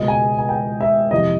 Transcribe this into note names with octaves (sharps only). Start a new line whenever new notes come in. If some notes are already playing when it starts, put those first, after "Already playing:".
Already playing: C#2 B2 G#3 D#5
G#5
G#5
G5
E5
F2 C3 E3 D#5